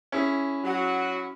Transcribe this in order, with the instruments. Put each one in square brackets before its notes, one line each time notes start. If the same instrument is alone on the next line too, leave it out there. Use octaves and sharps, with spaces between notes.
[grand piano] C#4 E4 G#4
[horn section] F#3 [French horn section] F#4